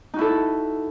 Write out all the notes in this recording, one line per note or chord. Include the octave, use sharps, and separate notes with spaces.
D#4 E4 F#4 A4